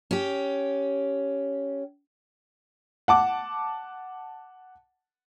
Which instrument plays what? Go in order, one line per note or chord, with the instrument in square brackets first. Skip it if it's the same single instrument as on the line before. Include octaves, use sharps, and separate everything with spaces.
[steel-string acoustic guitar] C#4 G4
[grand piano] F#5 A5 D6